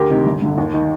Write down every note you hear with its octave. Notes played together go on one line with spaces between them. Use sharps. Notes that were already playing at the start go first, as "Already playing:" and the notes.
Already playing: D2 G4 A#4
C3 D#3
G1
G2 D3
D#2
D#3